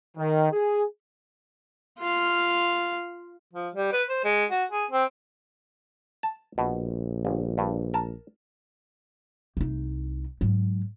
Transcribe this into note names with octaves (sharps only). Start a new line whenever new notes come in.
D#3
G#4
F4 F5
F3
G3
B4
C5
G#3
F#4
G#4
C4
A5
A#1 B2
G1
G2
A#4 A5
C2 D#4
G#2 F#3